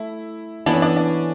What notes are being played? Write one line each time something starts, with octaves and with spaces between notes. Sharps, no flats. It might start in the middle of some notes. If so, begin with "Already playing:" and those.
Already playing: A3 E4
E3 B3 D4 E4
C#4
D4
D4